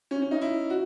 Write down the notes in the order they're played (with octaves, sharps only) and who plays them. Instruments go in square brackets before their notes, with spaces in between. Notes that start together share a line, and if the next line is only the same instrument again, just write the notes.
[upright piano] C#4
C#4
D#4
E4
F#4